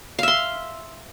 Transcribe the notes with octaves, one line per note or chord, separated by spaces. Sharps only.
E5 F5 C6